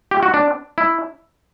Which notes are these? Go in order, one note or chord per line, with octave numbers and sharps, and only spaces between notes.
G4
F#4
D4
E4